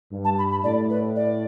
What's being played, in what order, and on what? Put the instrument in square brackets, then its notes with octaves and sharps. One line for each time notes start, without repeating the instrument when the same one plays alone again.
[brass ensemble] G2
[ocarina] A5
B5
B5
[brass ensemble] A2 [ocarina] D5
[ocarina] B4
D5